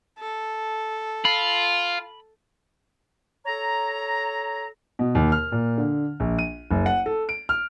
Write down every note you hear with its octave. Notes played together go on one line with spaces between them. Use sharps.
A4
F4 B5
A4 C#5 A#5
B2
D#2
F6
A#2
D3
A#1
D#7
F#1
F#5
A4
D7
F6